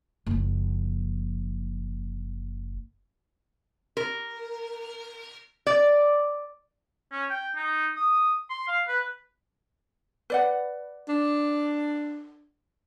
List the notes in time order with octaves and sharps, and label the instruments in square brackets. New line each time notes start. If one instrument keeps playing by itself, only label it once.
[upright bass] F#1 F3
[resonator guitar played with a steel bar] A#4
D5
[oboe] C#4
G5
D#4
D#6
C6
F5
B4
[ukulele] B4 D5 F#5
[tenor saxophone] D4